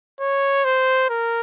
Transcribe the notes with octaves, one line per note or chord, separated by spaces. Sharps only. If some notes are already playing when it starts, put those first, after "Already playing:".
C#5
C5
A#4